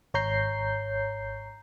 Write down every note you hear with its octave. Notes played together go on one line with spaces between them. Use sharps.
G#1 C#5 A#5 G6 C7